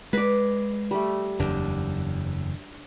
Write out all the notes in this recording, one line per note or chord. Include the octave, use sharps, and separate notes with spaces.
G#3 B4 D5
G3 A3
F#1 E2 D4